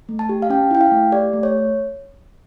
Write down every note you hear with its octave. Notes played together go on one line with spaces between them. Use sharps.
A3
A5
G4
F5
C#4 G5
E4 G5
F5
A3
G4 D5
A3
C#5